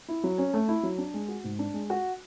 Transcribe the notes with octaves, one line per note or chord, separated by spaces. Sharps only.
E4
F#3
C#4
A3
E4
F#3
D4
G#3
F#4
G#2
D4
G#3
F#4